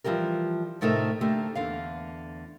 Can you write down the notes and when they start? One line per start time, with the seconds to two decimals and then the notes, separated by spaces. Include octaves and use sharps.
0.04 E3 F3 G3 G4 A#4
0.81 A2 C3 A3 D#4 A#4 E5
1.21 D3 A3 A#3 G4
1.55 E2 D3 F5